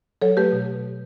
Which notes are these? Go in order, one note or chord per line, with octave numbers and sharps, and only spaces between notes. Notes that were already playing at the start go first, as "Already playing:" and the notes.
F#3 A4 C#5
A3 G4 B4
B2